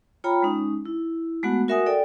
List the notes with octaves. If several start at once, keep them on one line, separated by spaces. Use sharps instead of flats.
F4 C#5 G5 A#5 B5
G#3 C#4 D#4
E4
G#3 A3 B3 F#4 F#5
F#4 A#4 E5 F#5 G#5 D#6
A4 D5 G5